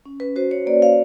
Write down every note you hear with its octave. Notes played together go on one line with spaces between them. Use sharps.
C#4
B4
F#4 C5
C#5
A#3 D5
F5